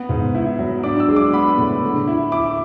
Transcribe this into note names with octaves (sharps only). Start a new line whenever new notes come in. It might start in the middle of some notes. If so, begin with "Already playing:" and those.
Already playing: B3
G#2
E4
F#3
D4 D6
E6
G#3
D6
B3 B5
A2
D3
E4
E4 D6